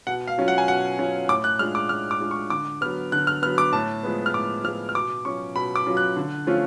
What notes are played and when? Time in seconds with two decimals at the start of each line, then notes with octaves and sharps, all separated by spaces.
0.07 B2 F#5
0.27 F5
0.38 F#3 C#4 F4
0.48 F#5
0.58 G#5
0.68 B2 F#5
0.99 F#3 C#4 F4
1.29 A2 D6
1.44 F#6
1.59 G#3 D4 F4 F6
1.75 D6
1.89 A2 F6
2.11 D6
2.20 G#3 D4 F4
2.31 C#6
2.50 D3 D6
2.81 F#3 B3 F6
3.12 D3 F#6
3.27 F6
3.42 B3 F6
3.46 F#3
3.58 D6
3.73 A2 A5
4.03 F3 G#3 B3
4.26 F6
4.34 A2 D6
4.64 F3 G#3 B3 F6
4.89 F6
4.95 B2 D6
5.25 F#3 C#4 F4 C#6
5.55 B2 B5
5.76 D6
5.86 F#3 C#4 F4
5.97 F#6
6.16 D3
6.47 F3 A3 C#4 F4